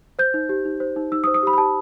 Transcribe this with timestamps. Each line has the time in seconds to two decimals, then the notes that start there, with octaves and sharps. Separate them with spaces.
0.19 C5 G6
0.34 D#4
0.49 G4
0.65 D#4
0.80 C5
0.96 D#4
1.12 D#4 E6
1.24 D#6
1.27 C5
1.34 D#6
1.43 G4 B5
1.53 B5
1.58 G4 A5